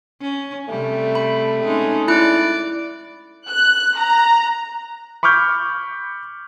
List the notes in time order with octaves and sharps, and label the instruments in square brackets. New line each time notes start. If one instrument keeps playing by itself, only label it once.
[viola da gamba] C#4
[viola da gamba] C3 G3 [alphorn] A3
[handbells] B5
[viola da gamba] G#3 C#4 D#4
[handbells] E4 F#6 [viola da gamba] D5
[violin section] F#6
A#5
[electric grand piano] B5 C#6 D6 F6 G6